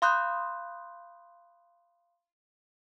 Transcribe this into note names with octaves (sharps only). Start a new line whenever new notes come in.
F5 B5 C6 D#6 F#6 G6